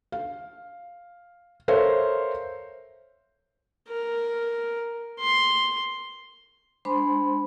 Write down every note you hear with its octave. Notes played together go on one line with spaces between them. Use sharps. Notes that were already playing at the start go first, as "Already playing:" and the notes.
F5
A4 A#4 C5 C#5 E5 F5
A#4
C6
G#3 D4 C5 B5 C6